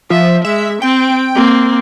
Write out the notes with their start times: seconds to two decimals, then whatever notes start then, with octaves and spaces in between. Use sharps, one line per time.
0.10 F3 E5
0.45 G#3 E5
0.82 C4 G5
1.35 A#3 C4